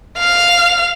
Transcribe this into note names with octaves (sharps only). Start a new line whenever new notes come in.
F5 F7